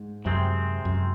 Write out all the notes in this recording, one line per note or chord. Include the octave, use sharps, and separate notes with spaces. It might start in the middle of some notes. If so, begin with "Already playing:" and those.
Already playing: G#2
F#2 C3 D#3 G#3 C4
F#2